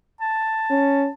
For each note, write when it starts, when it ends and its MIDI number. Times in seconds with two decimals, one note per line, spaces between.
0.21 1.13 81
0.70 1.08 61